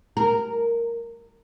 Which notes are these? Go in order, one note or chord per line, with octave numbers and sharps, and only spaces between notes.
A#4